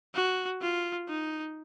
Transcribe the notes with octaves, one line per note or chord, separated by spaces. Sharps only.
F#4
F4
D#4